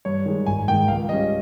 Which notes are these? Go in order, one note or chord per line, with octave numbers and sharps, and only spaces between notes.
G2 C#5
D#3 G#3
G#1 G#5
G#2 D#3 G#3 G5
C#2 F5
C#3 G3 C#4 D#5